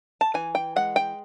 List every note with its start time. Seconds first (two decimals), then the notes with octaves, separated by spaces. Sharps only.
0.21 A5
0.34 E3 G#5
0.55 G5
0.76 G#3 F#5
0.96 G5